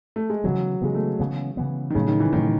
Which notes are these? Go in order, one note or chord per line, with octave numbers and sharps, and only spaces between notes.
A3
G#3
C#3 E3 F#3 B3
C#3 E3 G#3 B3
A3
C#3 E3 B3
C#3 E3 B3
D#3
A2 C#3 F#3 A3 C#4
D#3
E3
A2 D#3 F#3 A3 C#4